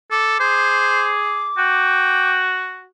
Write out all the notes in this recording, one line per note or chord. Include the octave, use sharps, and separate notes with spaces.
A4 D6
G#4 C5
F#4 G5